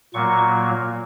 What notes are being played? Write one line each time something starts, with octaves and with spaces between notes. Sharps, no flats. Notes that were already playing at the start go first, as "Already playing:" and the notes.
A#2 F#3 A#3 C#6